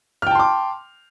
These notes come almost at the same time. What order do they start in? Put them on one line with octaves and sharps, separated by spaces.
F6 G5 A5 C6 D6